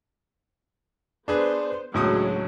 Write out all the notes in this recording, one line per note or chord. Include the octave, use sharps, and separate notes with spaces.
B3 D4 G#4 B4 C5
C#2 A2 F#3 G#3 D4 D#6